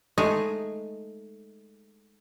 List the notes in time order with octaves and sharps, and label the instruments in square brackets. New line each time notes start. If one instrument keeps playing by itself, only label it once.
[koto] G#3 A3 D#4 G#4